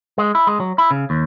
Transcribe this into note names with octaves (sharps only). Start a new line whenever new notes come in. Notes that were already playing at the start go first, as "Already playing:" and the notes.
G#3
E4
G#3
F#3
E4
C#3
D#2